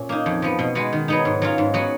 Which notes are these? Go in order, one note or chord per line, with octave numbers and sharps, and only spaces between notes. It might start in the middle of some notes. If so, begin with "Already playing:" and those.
Already playing: A#2 C#4
A#3 D#4
F2
F3 B3
B2
G#3 B3 F#4
D#3
F#3 B3 D#4
G#2
F#3 C#4 F4
G#2
F#3 B3 F#4